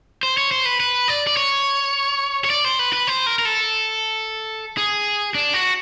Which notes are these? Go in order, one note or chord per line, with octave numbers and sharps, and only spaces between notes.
C5
C#5
C5
B4
B4
D5
D5
C#5
C#5
D5
C5
B4
B4
C5
A#4
A#4
A4
G#4
D4
F#4